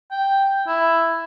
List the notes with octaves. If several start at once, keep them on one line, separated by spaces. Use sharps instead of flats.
G5
E4